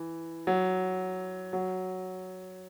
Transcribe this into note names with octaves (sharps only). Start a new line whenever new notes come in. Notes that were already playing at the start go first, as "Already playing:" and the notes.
Already playing: E3
F#3
F#3